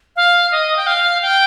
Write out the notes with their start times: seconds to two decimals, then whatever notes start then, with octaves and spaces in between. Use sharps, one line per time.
0.16 F5
0.52 D#5
0.77 G5
0.87 F5
1.22 G5